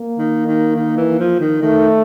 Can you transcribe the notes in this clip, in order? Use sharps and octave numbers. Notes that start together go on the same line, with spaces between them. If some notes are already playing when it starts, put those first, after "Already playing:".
Already playing: A#3
D#3
D#3
D#3
E3
F3
D#3
D#3 A3